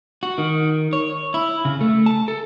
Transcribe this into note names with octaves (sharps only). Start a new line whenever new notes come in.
F#4
D#3
C#5
E4
C#3
A3
A5
A4